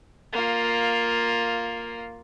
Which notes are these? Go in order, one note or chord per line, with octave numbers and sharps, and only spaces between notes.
A#3 F4